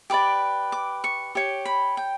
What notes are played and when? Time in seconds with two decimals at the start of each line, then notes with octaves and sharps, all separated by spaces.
0.10 G4 B4 D5 D6
0.72 D6
1.04 C#6
1.35 G4 C#5
1.65 B5
1.97 G5